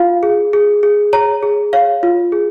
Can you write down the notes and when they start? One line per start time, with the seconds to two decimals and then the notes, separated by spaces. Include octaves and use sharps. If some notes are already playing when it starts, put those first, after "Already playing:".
Already playing: F4 F5
0.23 G#4
0.53 G#4
0.83 G#4
1.13 C#5 A#5
1.43 G#4
1.73 C#5 F5
2.03 F4
2.32 G#4